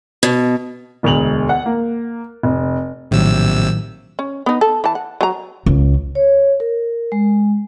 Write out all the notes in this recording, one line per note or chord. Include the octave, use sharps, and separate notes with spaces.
B2
E1 D2 G#3 F7 F#7
F#5
A#3
F1
A#1 A2 C3 D#3 F#3 E6
C#4
B3 D#4
A4
E3 A5
F#5
F#3 A#5
C#2
C#5
A#4
G#3